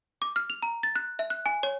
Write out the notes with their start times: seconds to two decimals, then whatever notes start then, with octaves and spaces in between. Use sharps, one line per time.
0.22 D6
0.36 F6
0.50 F7
0.63 A#5
0.83 A6
0.96 F#6
1.19 E5
1.30 F#6
1.46 G#5
1.63 C#5